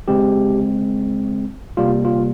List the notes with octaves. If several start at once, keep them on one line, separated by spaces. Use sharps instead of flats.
C#3 G#3 C4 G4
C3 G3 A#3 F4
F4